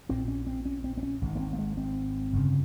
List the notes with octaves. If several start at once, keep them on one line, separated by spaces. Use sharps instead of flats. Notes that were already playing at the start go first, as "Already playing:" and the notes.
A#1 A#2 C4
C#4
C4
C#4
C4
C4
C#4
G#1 G#2
A#3
C4
A#3
G#3
C4
G1 F2 C#3